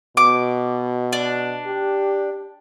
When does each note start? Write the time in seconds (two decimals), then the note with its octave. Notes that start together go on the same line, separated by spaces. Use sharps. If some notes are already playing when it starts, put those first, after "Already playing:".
0.17 B2 D6
1.13 D4
1.66 G4